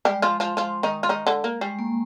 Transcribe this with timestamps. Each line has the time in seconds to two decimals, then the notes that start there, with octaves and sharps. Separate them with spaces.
0.05 G3 G#3 G4
0.22 F3 F4
0.40 F3 F4
0.57 F3 F4
0.83 D#3 D#4
1.03 F4
1.09 D#3 D#4
1.27 D3 D4
1.44 A#3
1.61 G3 G#3
1.79 A#3